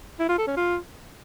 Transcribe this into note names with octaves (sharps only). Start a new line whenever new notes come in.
E4
F4
A4
C#4
F4